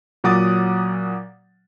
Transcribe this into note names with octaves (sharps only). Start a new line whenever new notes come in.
A#2 F#3 F#5 D6 D#6 A6